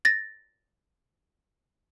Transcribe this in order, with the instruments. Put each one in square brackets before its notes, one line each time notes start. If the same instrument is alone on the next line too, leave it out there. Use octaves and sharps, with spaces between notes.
[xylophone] A6 A#6